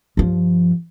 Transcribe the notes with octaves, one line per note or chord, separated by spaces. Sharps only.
G2 F3